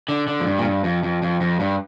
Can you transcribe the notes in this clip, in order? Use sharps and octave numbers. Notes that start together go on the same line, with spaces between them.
D3
D3
F2
G2
A#2
G2
F2
F2
F2
F2
G2